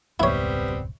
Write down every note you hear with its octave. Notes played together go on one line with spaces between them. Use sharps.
E1 C#2 G#2 G3 B3 C4 E4 C#5